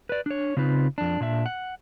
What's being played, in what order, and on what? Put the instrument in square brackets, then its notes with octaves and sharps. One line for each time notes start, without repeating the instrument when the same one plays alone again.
[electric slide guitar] B4 D5
D4 C#5
C#3 C4 D#4 F4 B4
F2 D4
A#2 D4 E5
F#5